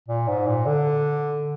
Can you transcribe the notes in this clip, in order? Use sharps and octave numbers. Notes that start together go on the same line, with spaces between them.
A#2
G#2
A#2
D3